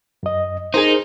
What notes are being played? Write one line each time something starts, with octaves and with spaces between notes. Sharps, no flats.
F#2 D#5
D#4 G#4 A#4 C5